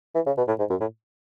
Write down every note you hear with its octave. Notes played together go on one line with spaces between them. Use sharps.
E3
C#3
B2
A2
G#2
F#2
A2